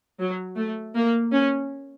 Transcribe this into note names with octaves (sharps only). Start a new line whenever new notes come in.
F#3
A3
A#3
C#4